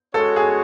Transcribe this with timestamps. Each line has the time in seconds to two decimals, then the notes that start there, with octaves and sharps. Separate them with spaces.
0.14 G#3 C#4 F#4 A4 C#5
0.36 G#4